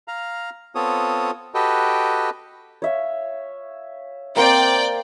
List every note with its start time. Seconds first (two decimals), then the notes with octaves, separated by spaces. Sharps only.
0.08 F5 A#5
0.75 B3 C4 F4 A4 C#5 D#6
1.54 F#4 G4 A4 B4 D#5 G5
2.82 C#5 E5 F5
4.36 A#3 C4 C5 D5 G5